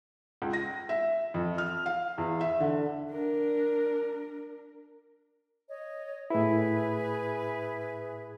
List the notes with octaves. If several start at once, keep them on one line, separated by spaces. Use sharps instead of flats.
C#2
A#6
E5
F2
F6
F5
E2
E5
D3
D4 A#4
C#5 D#5
A2 E4 G#4 B4 E5